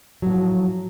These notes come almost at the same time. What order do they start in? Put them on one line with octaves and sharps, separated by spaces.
F#3 A2 F3